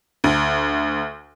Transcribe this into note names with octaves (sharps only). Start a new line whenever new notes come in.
D2